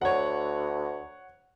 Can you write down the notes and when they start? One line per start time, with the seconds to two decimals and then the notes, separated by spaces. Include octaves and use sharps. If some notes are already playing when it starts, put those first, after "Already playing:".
0.01 D2 C#5 F#5